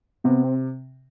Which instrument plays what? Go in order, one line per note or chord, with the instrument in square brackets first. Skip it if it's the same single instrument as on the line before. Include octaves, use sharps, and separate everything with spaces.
[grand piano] C3 [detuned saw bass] B3
[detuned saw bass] C4